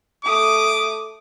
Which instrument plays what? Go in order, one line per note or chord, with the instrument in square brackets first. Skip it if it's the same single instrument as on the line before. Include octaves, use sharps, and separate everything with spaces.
[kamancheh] A3 D#6 [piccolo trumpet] D6